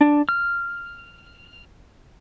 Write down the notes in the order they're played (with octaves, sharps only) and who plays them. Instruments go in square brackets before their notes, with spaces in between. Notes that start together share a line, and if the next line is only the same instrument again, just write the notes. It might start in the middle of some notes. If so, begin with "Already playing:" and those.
[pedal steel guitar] D4
F6